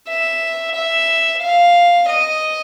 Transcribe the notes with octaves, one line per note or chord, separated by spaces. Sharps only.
E5
E5
F5
D#5